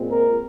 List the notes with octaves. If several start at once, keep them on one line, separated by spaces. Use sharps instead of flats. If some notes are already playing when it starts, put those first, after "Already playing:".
Already playing: A#2 G#3 C4
A#4